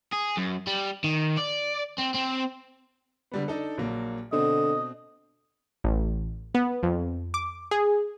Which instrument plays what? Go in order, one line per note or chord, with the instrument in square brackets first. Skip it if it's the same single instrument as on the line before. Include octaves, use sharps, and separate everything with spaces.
[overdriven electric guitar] G#4
F#2
G3
D#3
D5
C4
C4
[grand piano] D3 G3 B3
D4 D#4 A4
A#1 F#3 A#3
[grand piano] B2 C4 [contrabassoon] D3 [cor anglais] D#5
[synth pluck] A1
B3
F2
D6
G#4